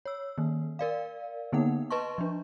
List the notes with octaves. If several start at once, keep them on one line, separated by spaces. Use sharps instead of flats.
C#5 E6
D#3 A#3
A#4 D5 F5
D3 A#3 B3 D#4 F#5
B4 D#5 A5 C6 C#6
F3 D4